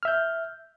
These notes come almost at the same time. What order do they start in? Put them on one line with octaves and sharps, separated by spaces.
F6 E5 G6